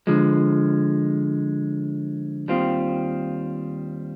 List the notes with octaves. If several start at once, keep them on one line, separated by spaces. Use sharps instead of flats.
D3 F3 G#3
D#2 D#3 G3 C4 F4